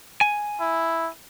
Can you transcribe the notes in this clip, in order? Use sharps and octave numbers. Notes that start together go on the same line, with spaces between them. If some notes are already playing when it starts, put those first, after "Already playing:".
G#5
E4